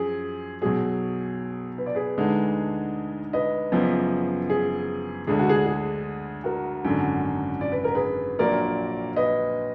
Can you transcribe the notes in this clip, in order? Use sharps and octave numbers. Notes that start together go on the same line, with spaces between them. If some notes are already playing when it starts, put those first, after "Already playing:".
Already playing: F#2 F3 G#4
B1 B2 F#3 G#4
B4
D5
G#4 B4
D2 D3 G#3 D#4
B4 D#5
F#1 F#2 F3 B3
G#4
D2 D3 G#3 G#4
F#4
G#4
G#4
F#4 A#4
G#1 F#2 D3
D5
B4
A#4
G#4 B4
A#1 A#2 F#3 A#4 D5
B4 D#5